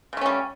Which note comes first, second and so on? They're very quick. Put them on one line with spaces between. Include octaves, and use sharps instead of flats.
C#3 A3 C#4 G3